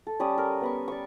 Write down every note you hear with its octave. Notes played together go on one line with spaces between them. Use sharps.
A4
G3 C#4 D5 D#6
A#4
B3 B5 C#6
D5 C#6